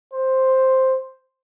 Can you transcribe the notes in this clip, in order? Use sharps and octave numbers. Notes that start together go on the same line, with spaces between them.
C5